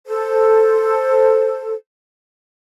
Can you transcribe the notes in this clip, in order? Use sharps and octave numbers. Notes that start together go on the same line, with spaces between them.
A4 C5